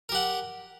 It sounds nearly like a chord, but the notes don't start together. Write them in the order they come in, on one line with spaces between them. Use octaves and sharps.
A#4 G4 F#5